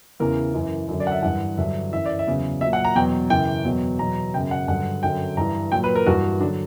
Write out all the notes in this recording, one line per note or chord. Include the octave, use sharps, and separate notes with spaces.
E2 C#3 E3 A#4
F#2 E3
F#2 D3 F#3
D5
F#5
E5
G2 E3 F#5
G2 D3 F#3 E5
F#2 E3 E5
D5
E5
E2 C#3 F#3
A#2 F#3 E5
F#5
A#5
E2 B2 F#3 G5
F#2 C#3 E3 G5
E2 B2 F#3
E2 B2 F#3 A#5
F#2 C#3 F#3 G5
F#5
G2 D3 F#3 F#5
F#2 D3 F#3 G5
G2 E3 A#5
A#2 F#3 G5
B4
A#4
G2 E3 F#4
D3 F#3 D4